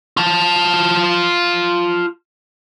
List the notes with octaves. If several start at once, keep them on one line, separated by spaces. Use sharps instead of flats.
F4 A5